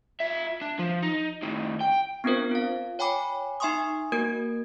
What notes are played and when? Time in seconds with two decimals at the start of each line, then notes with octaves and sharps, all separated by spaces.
0.20 F4 E5
0.61 D4
0.79 F3
1.03 D#4
1.43 A2 D#3
1.81 G5
2.24 B3 C4 D4 F4 A#4 C5
2.51 F4 F5
2.99 C#5 G5 G#5 B5 D6
3.60 D#4 E5 G#5 C6 C#6 D#6
4.12 A#3 F#4 A#4 G#6 D7